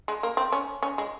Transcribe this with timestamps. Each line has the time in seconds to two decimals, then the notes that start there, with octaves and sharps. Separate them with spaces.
0.08 G#3
0.23 A#3
0.37 C4
0.52 C#4
0.83 C#4
0.98 G#3